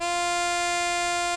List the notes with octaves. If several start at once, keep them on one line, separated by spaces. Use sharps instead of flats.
F4